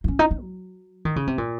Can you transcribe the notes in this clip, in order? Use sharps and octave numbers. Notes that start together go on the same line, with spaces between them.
D#4
C#4
D#4
D#4
F#3
D#3
C#3
C3
A#2